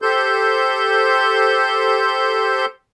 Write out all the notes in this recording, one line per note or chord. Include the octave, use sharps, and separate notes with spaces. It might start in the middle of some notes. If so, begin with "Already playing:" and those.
G4 A4 C5 C6 G6